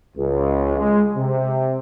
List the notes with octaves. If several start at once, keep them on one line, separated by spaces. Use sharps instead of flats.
C#2
G#3
C3